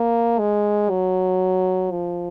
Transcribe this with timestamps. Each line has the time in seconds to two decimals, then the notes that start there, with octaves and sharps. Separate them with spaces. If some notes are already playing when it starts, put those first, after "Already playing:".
Already playing: A#3
0.39 G#3
0.90 F#3
1.91 F3